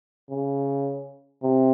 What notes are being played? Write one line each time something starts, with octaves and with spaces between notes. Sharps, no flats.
C#3
C3